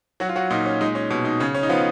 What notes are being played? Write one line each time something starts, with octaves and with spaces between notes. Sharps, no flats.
F#3 F#4
F4
F#3 F#4
A#2 D#4
C#4
G#3 D#4
C#4
B2
D#4
C#3 C#4
C#4
D#4
F3 B3 F4